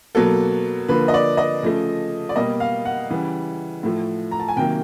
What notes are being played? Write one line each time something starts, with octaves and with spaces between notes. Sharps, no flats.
B2 F#3 A#3 A4
D3 F3 A#3 B4
D#5
D5
D#5
C#3 F3 A3
D5
B2 G3 A#3 D#5
F5
F#5
C#3 E3 G3
A2 F3 A3
A#5
A5
G#5
C3 D#3 F#3 A#3 G5